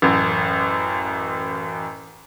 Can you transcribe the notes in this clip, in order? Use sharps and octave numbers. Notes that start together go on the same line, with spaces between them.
A1 F#2